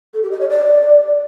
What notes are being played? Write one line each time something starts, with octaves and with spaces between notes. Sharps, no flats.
A4
G4
D#5
C#5
D5